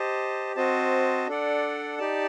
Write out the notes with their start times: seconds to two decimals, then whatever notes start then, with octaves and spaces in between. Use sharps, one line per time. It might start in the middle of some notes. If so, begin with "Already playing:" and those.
Already playing: G4 C5 D#5 A5
0.56 C4 F#4 C5 D#5 A5
1.27 D4 A4 D5 F#5
1.98 D#4 G4 D5 A5